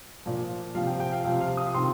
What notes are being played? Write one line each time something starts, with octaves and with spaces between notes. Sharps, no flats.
A#2 F3
C3 F3 F5
G5
G5
F5
C3 F3 F5
F5
D#6
C3 D#3 C6